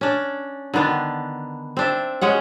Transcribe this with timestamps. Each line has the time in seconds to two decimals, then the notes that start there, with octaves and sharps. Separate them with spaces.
0.01 C#4 D4
0.74 D3 D#3 B3 D4
1.77 C4 D4 E5
2.21 G#3 C#4 F#5